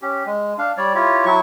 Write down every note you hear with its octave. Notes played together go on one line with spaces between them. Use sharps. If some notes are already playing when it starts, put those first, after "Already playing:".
C#4 G4
G#3
D4 F5
G3 C#5 D5
E4 F4 G4 C#5
F#3 E4 C#6